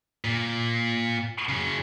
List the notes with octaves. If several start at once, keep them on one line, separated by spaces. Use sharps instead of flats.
A#2
C#3 F#3